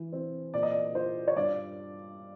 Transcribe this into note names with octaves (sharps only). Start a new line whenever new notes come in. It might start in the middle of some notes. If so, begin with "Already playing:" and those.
Already playing: E3
C4
A#2 D5
D#5
D5
F4 C5
C#5
G2 D5